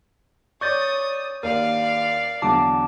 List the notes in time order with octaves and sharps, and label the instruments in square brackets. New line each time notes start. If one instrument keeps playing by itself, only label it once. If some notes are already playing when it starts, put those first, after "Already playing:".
[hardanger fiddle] C#5 D#6 [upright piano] D5 [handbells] C#6 G6 A6
[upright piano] D#2 [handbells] A#4 [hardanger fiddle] D5 F5
[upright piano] E2 D3 F#3 [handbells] A5 D6